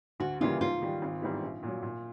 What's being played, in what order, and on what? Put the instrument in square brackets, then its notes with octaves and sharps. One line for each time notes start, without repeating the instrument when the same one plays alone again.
[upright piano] D2 [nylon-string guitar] F#4
[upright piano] C#3 E3 G3 A#3 [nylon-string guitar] F4
[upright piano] G#2 [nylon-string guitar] F4
[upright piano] D#3 G3
G#1
G#2 E3 G3 B3
A#1
A#2 F#3
A#2